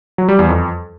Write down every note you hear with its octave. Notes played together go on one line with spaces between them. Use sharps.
F#3
G3
E2
F2